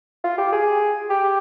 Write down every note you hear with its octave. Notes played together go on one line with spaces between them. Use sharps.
F4
G4
G#4
G4